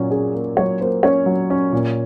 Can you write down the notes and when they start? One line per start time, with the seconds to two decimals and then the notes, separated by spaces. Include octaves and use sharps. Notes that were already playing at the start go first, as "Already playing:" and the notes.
Already playing: A#2 F#3 C#4
0.10 C#4 G#4
0.34 A#3
0.57 F#3 C#5
0.80 A#3 C5
1.03 C#4 C#5
1.26 F#3
1.50 C#4
1.73 A#2